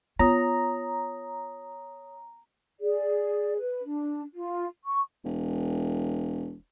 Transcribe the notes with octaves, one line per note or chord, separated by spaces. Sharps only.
B3 F4 C#5 A#5 D#6
G#4 D5
B4
D4
F4
C#6
E1